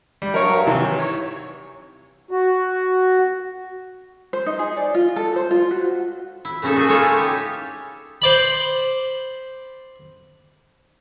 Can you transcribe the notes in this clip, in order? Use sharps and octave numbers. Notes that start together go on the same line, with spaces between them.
G3
G2 F#3 A#4 C#5 C#6
C3 D#3 E3
C#5
F#4
C5
D#4
G#4
D5
F4
A4
C5
F4
F#4
E4
A#2 C#3 C#4 D#4 A4
F#4 G#4 G#5
C#4 E4 F4 A4 C#5
C#4 D#4 E4
G4
C5 D5 B5